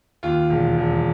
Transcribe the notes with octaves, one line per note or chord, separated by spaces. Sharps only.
D#2 F4
E1
E1